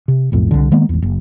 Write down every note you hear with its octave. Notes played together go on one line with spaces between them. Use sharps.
C3
B1 F2 A2
C2 D3
D#3 G#3 A#3 B3
G#1 E2
F#1